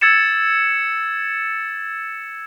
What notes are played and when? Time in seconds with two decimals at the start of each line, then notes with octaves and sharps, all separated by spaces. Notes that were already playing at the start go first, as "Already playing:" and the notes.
0.01 E6 G#6 A6 C#7 E7